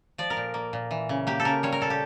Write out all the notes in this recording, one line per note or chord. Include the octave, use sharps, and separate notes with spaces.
F3 D5
A#4
A#2
A#3
A#2
E3
C#3
A#3 G4
A4
C#3 A#4
G3 C#5
A#4
A#2 A4
G4